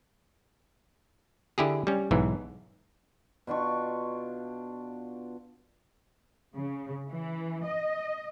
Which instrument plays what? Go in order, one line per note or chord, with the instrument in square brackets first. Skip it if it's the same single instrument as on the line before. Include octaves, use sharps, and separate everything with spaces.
[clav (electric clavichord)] D3 E4 G4 G#4
G3 C#4
B1 G#2 E3
[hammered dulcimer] B2 D4 F4 C#6
[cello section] C#3
E3
D#5